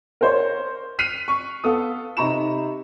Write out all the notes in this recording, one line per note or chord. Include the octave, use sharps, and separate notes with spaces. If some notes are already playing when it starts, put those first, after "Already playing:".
A#4 C5 C#5
F6 F#6 B6 C7 D#7 F7
C#6
B3 A4 F5 D#6
C3 D#4 A#5 B5 C#6 E7